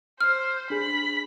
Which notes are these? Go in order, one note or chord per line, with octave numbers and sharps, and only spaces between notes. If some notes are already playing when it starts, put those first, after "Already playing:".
C5 F6
D4 G#4 B5